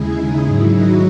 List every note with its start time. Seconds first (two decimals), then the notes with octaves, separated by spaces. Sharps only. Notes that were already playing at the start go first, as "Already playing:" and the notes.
Already playing: D#2 C#3 G#3 E4 G#4
0.16 D#4
0.44 G#2 D#3 F#3 E4
0.73 D#4 F#4